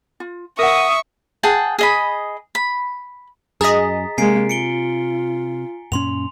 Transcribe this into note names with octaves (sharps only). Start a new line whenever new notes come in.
F4
A#4 E5 F#5 C#6 D#6
G#4 F#5 G5 A5
G#4 D#5 B5
B5
F#2 G#4 D#5 A#5 A6 B6
C3 G#3 A#3 G#5 C7 D7
F4 C#7 D7 G7
F#2 A#2 C#4 C6 F7